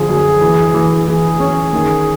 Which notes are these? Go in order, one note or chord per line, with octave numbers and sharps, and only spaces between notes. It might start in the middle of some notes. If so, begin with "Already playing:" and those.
Already playing: D3 F3 G#4
F#2
E3
E3
E3 G#4
C#4
D#3